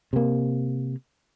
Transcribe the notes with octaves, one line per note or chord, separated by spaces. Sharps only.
C3 A#3